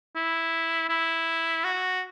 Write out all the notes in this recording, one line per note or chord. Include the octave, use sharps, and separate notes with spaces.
E4
E4
F#4